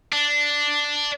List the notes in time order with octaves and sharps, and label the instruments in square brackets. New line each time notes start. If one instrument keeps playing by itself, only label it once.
[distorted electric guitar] D4